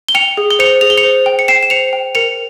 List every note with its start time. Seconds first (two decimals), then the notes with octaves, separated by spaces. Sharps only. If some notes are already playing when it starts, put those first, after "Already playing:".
0.09 G7
0.15 G5 C#7 F7
0.37 G#4
0.51 G7
0.59 C5 C#7 F7
0.81 G#4 F7
0.90 G7
0.97 C#7 F7
1.04 C5
1.26 G5
1.39 C#7
1.48 G5 C7 E7
1.63 E7
1.70 C5 C#7 F7
1.93 G5
2.15 A#4 C#7 F7